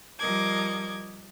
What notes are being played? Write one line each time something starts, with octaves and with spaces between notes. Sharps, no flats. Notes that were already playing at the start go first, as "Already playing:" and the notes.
F3 G3 A#4 D#5 D6 G#6